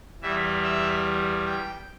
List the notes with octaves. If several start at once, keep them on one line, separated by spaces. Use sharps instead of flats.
E2 E3 G3 E5
E5
G5